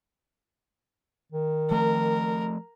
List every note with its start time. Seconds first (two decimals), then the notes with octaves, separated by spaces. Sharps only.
1.32 D#3
1.71 F3 A3 A#4